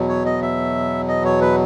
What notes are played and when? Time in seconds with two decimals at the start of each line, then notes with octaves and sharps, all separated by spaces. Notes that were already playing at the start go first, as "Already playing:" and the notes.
Already playing: E2 B2 F#3
0.09 C#5
0.25 D#5
0.42 E5
1.08 D#5
1.25 C#5
1.41 B4